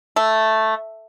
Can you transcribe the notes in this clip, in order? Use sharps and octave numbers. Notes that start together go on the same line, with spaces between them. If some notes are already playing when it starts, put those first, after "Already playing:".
A3